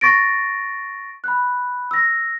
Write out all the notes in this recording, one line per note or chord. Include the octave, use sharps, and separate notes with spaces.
C#6 A6 A#6 D7
B5 F#6
E6 A#6